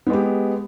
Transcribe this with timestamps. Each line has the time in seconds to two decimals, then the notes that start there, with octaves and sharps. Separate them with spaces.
0.06 B3
0.10 G#3
0.13 G4